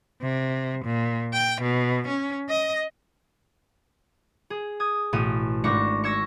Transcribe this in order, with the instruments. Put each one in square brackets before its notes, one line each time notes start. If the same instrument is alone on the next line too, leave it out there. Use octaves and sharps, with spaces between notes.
[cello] C3
A#2
G5
B2
C#4
D#5
[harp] G#4
D#6 G#6
A1 B2 A4 D#7
G#1 A3 D4 C#6 A#6
C#6 E6 G#6 A#6 C#7